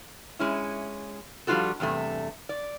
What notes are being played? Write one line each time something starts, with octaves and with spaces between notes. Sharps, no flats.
G#3 C#4 E4
F3 G3 D4 F4 F#4 A4
E2 G2 C3 A3
D5